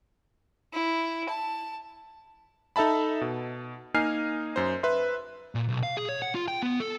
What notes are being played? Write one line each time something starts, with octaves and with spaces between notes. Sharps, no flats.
E4
A5
D#4 A4 E5 A5 B5
B2
A#3 D#4 G#5 F6 C7
F#2 C5
B4 E5 C6
A#2
B1
F5
G#4
C#5
F#5
F4
G5
B3
A4